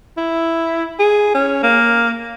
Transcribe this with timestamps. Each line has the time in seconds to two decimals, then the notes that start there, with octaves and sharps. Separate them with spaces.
0.17 E4
0.99 G#4
1.34 C#4
1.63 A#3